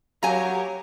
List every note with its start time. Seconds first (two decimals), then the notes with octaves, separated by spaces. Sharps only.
0.23 F#3 G4 A#4 C#5 F5 G#5 A#5